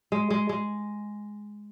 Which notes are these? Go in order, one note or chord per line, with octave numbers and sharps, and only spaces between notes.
G#3
G#3
G#3